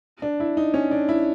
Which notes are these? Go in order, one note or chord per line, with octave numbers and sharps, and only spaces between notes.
D4
E4
D#4
C#4
D4
E4